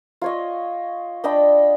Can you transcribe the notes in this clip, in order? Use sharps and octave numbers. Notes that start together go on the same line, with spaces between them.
F4 C#5 D#5
D4 D#5 G5 B5